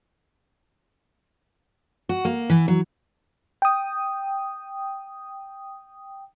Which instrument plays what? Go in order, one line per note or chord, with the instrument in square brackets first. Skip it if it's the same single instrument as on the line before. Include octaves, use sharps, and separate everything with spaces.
[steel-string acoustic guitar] F#4
A#3
E3
F#3
[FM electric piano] G5 D#6